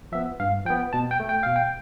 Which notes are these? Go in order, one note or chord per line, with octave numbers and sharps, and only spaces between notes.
F3 B3 E5
G2 F5
F3 B3 G5
B2 A5
G5
A3
G5
B2 F5
G5